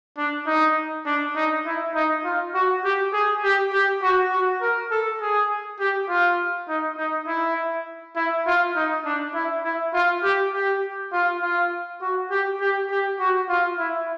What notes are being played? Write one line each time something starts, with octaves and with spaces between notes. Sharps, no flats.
D4
D#4
D4
D#4
E4
D#4
F4
F#4
G4
G#4
G4
G4
F#4
F#4
A#4
A4
G#4
G4
F4
D#4
D#4
E4
E4
F4
D#4
D4
E4
E4
F4
G4
G4
F4
F4
F#4
G4
G4
G4
F#4
F4
E4